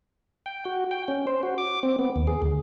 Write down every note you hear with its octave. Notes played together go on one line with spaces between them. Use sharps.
G5
F#4
G5
C#4
C5
F#4
D6
C4
B3
D#2
G#4
D2